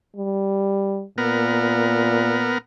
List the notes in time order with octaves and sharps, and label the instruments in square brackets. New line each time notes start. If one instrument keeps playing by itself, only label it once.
[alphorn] G3
[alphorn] A#2 [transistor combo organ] B3 A#4